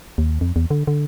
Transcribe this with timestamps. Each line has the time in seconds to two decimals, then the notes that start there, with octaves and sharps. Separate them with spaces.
0.18 D#2
0.41 F2
0.56 E2
0.71 D3
0.87 D3